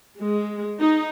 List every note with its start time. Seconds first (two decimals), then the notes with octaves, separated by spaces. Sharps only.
0.20 G#3
0.81 D#4